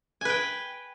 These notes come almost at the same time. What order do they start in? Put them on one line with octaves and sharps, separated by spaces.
G#5 B4 G5